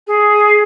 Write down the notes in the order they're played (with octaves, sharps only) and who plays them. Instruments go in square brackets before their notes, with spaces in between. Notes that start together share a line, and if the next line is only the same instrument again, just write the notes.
[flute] G#4